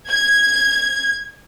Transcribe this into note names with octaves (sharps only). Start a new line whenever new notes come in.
G#6